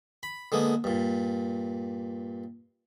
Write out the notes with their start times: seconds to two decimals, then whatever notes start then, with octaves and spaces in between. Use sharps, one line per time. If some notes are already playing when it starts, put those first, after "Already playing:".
0.23 B5
0.52 D3 G#3 A#3 B3
0.84 G2 A#2